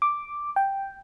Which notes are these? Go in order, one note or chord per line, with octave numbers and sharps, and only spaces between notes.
D6
G5